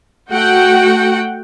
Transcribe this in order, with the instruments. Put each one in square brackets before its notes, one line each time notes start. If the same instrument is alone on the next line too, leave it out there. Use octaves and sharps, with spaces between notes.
[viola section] A3 F#4 F#5 G5